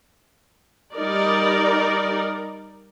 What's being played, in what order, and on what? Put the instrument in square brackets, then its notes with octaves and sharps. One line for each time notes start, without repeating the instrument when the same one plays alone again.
[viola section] G3 D#4 A#4 D5